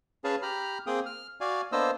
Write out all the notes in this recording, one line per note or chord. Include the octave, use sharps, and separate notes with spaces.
C#4 G#4 B4 C#5 F5 A5
G4 A#5 B5 F6
A#3 C4 G#4 G5 D#6
F6
F#4 D5 F5 G#5
A#3 B3 D4 C5 D#5 E6